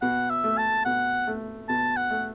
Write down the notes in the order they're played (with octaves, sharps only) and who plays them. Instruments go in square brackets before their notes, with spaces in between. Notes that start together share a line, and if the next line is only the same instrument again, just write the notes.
[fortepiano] B2 [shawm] F#5
[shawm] E5
[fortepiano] A3
[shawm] A5
[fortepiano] B2 [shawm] F#5
[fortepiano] A3
[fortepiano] B2 [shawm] A5
[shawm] F#5
[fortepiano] A3